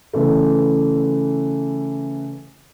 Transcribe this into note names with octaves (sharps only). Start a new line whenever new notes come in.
C#3 E3 A3